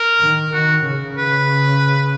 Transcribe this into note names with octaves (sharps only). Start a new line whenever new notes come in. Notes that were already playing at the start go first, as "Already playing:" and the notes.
Already playing: A#4
D#3
D#3 F#4
C#3
B4